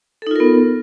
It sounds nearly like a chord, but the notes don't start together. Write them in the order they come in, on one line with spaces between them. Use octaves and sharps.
A4 D#4 F4 A#4 B3